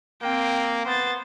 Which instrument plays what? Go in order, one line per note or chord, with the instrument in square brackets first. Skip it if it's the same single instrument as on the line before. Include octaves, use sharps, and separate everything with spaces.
[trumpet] A#3 [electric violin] C4 G5
[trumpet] B3 [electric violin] C5 A6